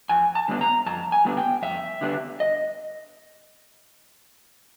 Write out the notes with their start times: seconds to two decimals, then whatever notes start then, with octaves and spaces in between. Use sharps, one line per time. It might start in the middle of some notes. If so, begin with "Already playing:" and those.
0.09 F2 G#5
0.35 A5
0.48 D3 G3 B3 D4
0.61 A#5
0.86 F2 A5
1.12 G#5
1.25 D3 G3 B3 D4
1.37 G5
1.62 F2 E5
2.01 D3 G3 B3 D4
2.40 D#5